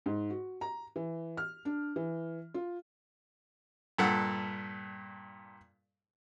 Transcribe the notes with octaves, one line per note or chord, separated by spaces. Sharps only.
G#2
F#4
A#5
E3
F6
D4
E3
F4
G2 A#2 A4 F#5